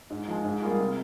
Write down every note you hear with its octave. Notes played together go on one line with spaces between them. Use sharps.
G#2
F3 G#3
G#2
G3 A#3 F4 G#4
C3